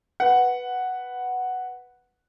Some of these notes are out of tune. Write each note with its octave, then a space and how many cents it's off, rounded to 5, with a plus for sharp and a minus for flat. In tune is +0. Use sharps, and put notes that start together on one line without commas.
B4 +0 F#5 +0